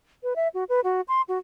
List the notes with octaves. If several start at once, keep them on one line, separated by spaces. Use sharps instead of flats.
B4
E5
F#4
B4
F#4
C6
F#4